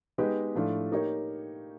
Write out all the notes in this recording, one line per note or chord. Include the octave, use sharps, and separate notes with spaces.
G#3 B3 D#4 G4 B4
A2 F3 A3 D4 F4
A#3 D#4 G4 A#4 C#5